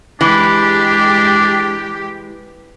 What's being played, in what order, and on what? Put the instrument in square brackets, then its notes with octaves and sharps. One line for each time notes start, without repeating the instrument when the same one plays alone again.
[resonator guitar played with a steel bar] E3 [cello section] G#3 G4 [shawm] D4